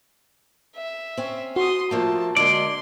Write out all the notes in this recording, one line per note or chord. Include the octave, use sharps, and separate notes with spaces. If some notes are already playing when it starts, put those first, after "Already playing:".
E5
C4 C#4
F#4 C6 D#6
F3 A3 A#3 A5
D3 G#3 A#3 D5 C6